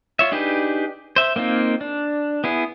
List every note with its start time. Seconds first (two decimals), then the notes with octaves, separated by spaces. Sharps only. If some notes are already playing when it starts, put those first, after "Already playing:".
0.19 F4 C#5 E5
0.32 D4 D#4 G4 G#4 B4
1.16 C5 E5
1.36 A#3 C4 D#4 F4
1.81 D4
2.44 B3 E4 G#4